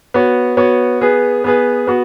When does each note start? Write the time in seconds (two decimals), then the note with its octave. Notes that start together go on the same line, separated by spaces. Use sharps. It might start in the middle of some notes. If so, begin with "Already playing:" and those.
0.14 B3 F#4 C#5
0.57 B3 F#4 C#5
1.01 B3 G#4 B4
1.44 B3 G#4 B4
1.87 B3 F#4